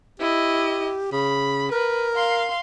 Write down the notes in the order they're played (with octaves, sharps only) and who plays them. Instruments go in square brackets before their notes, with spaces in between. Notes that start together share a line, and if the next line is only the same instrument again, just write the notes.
[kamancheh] E4 D#5 [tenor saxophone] G4
[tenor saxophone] C#3 [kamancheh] B5
[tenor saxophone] A#4 [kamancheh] B4
[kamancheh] F5 C6